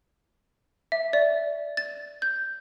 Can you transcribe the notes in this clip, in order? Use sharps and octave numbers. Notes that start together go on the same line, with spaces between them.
E5
D5
A6
G6